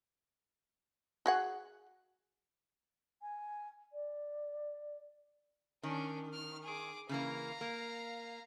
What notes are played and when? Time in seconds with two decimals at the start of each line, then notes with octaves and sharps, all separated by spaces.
1.26 F#4 G#4 F#5
3.22 G#5
3.92 D5
5.83 D#3 C#4 D4
6.33 F6
6.63 G#4 D6
7.09 C#3 E3 A#3 F5 A#5
7.61 A#3